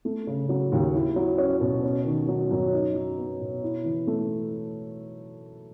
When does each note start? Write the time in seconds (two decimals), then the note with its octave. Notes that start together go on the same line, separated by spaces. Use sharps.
0.05 A3
0.27 C#3
0.49 F#3
0.72 D#2
0.94 E4
1.16 F#3
1.38 C#4
1.60 B2
1.83 C#4
2.05 D#3
2.28 F#3
2.51 F#2
2.73 D#4
2.95 F#3
3.17 B3
3.40 B2
3.63 E4
3.84 E3
4.07 A3